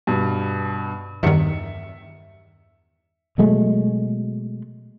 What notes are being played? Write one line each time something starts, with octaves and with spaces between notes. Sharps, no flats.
G2 B2
E2 G2 D#3 E5 C#7
B2 F#3 G#3 A3